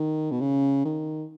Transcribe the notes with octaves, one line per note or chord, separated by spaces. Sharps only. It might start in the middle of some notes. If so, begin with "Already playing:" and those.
Already playing: D#3
B2
C#3
D#3